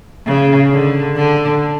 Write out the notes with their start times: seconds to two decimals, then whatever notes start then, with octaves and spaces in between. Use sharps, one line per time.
0.26 C#3
0.71 D3
1.16 D3